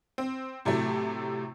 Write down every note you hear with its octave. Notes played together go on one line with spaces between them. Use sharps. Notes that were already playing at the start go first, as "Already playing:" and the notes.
C4
A2 C3 F#3 A3